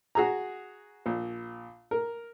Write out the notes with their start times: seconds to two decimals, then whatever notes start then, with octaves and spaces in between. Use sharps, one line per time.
0.15 F#4 G#4 A#5
1.06 A#1
1.91 A#4